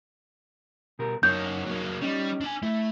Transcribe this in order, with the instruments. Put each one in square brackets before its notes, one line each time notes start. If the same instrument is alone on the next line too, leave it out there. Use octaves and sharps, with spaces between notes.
[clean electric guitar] B2 G4 A#4
[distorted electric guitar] F#2 A#3 [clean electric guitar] D#4 C#5 [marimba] G6
[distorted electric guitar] F#3 A#3
[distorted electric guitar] G3 [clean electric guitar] C#4 D#4
[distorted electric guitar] D4 G#5
[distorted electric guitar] A3 [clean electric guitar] E4